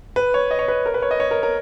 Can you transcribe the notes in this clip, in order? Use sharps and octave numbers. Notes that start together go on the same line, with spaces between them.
B4
C#5
D#5
C#5
B4
A#4
B4
C#5
D#5
C#5
A#4
A#4